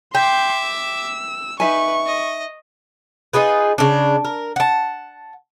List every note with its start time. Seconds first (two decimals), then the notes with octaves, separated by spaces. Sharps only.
0.15 E5 G5 C6 D6
0.66 E6
1.60 D#4 B4 E5 G#5 C#6
2.06 D#5
3.33 D#4 F4 G#4 B4
3.78 C#3 D4
4.25 A#4
4.56 F#5 A5